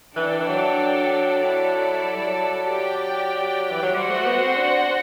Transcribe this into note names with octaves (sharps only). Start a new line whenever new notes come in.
E3 D4 A4 D5 G5
E3
F#3
E4 A4 D5
F#3
G3
F#3
G4 D5 G5
E3
F#3
G3 F#4 C5 F#5
A3
B3
C4
D4